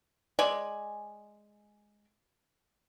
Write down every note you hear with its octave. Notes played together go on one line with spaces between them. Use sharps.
G#3 D5 G#5